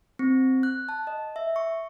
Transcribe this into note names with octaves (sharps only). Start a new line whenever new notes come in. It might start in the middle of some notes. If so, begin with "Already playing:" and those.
C4
F#6
A5
D#5
E5
C#6